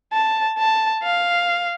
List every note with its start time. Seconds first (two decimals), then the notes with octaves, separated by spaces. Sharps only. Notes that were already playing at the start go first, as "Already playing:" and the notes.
0.13 A5
0.58 A5
1.03 F5